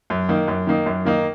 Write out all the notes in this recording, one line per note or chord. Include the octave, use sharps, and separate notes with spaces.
F#2
D#3 A#3 D#4
F#2
D#3 A#3 D#4
F#2
D#3 A#3 D#4